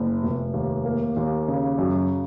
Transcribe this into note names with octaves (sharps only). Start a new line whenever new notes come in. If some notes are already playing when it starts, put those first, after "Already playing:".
Already playing: F#1
F1
D#2
A#3
D#2
C#3
F#2